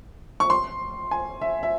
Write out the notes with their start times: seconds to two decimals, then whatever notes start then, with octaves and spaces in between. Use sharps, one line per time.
0.40 C#6
0.50 C6
1.11 G#5
1.41 E5
1.63 E5